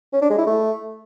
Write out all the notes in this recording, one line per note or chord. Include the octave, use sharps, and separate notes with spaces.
C#4
D4
G#3
E4
A3